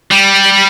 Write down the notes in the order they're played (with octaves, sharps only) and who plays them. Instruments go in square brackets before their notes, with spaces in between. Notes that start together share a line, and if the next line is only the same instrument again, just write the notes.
[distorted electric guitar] G3